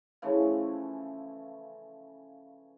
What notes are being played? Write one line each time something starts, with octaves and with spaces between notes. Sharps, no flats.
C#3 E3 F3 A3